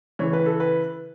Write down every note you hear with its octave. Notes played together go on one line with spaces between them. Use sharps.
C#3 E3 C#5
B4
A4
B4